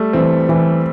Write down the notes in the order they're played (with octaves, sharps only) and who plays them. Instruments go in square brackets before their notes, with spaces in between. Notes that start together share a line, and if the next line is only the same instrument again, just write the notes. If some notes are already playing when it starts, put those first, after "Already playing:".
Already playing: [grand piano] G3 A3
[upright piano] E3 [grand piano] C4
[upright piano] E3